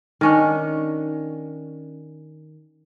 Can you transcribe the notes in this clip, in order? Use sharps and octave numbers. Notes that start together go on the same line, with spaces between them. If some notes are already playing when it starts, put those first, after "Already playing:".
D#3 C#4 D4